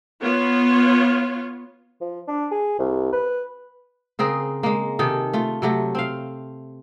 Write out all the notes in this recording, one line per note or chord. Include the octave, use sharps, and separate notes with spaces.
B3 F4 C#5
F3
D4
G#4
C2
B4
C#3 C4 G#4 A#4
G#3 A#3
C3 D#3 G#4 A4
A3 F4
C3 F#3 A3
C4 F5